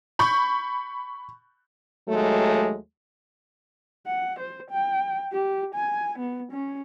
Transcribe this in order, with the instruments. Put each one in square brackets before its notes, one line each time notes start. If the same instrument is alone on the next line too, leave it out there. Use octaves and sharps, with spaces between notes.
[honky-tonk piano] B5 C#6 G6
[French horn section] D#2 F#3 G#3 A3
[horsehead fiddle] F#5
C5
G5
G4
G#5
B3
C#4